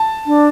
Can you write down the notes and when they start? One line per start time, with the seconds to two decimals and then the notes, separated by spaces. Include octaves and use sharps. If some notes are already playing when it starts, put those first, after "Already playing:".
Already playing: A5
0.27 D4